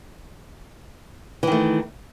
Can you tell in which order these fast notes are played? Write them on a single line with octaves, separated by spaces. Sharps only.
E3 D#3 A3